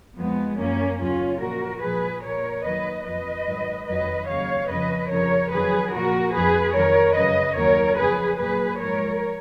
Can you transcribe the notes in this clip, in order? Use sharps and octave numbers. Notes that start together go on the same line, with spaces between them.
F2 F3 G#3 B3
F#2 F3 A#3 C#4
D#2 C#3 F#3 C#4 F4
A#2 F3 F#4 A#4
A#2 F3 G#4 B4
A#2 F3 A#4 C#5
D#2 D#3 F#3 B4 D#5
F2 F3 B4 D#5
G#2 D#3 F#3
F2 D#3 F#3 B4 D#5
D#2 C#3 F#3 C#5 F5
F2 C#3 F3 B4 D#5
F2 C#3 F3 A#4 C#5
F2 D#3 F#3 G#4 B4
A#2 F3 F#4 A#4
F2 F3 G#4 B4
F2 D#3 F#3 A#4 C#5
F#2 C#3 F#3 B4 D#5
D#2 D#3 F#3 A#4 C#5
F2 C#3 F3 G#4 B4
A#2 F#3 G#4 B4
G#2 F3 A#4 C#5